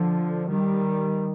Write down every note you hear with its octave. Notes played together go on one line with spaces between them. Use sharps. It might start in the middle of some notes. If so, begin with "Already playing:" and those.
Already playing: D3 F3
D#3 G3